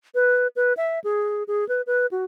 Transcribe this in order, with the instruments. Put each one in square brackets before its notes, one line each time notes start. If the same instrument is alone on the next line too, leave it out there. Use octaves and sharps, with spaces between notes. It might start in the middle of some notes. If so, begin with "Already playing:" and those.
[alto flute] B4
B4
E5
G#4
G#4
B4
B4
F#4